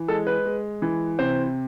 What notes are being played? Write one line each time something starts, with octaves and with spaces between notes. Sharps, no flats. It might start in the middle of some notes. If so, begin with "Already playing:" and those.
Already playing: E3
G#3 A4
B4
G#3
E3
C3 C5